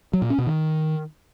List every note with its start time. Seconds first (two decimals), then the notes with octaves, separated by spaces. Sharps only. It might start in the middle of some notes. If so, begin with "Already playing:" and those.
0.14 F#3
0.22 A#2
0.30 C#4
0.38 B2
0.47 D#3